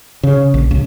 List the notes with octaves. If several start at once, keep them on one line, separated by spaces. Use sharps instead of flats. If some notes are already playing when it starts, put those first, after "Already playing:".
C#3
A#1
C#2